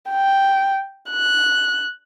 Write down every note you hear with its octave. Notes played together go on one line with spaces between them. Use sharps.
G5
F#6